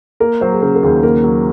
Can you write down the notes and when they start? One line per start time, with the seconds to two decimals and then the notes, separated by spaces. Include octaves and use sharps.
0.20 A#3 A#4
0.41 F#3 C5
0.52 G#4
0.62 C#3 A#4
0.75 A#4
0.83 D#2 G#4
1.03 A#3 A#4
1.24 F#3